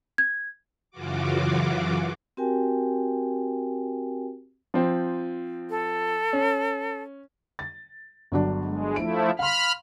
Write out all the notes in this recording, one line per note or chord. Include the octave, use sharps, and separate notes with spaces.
G#6
F#2 C#3 E3 F4 F#4 D6
C4 F#4 G4 A#4 G5 G#5
F3 C4
A4
C#4
A6
G1 F#3 D4
G#3
F3 A3 E4 D7
F5 B5 C6 F6